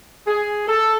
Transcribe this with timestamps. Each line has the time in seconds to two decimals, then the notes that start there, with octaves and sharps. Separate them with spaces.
0.27 G#4
0.68 A4